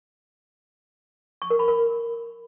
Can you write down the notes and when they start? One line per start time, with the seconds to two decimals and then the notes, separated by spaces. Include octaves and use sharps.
1.42 C#6
1.50 A#4
1.59 B5
1.68 A#4